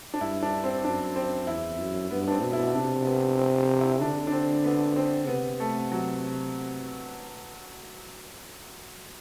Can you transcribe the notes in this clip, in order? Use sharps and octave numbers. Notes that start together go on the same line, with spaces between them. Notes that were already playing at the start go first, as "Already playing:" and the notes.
D4
G2 E4
D4
C4
F#2 D4
C4
E2 E4
F#2
G2 B3
D4
C4
B2
E4
C3 D4
B3
C4
E4
D3 D4
D4
C4
B3
C4
C3 B3
A3
F#3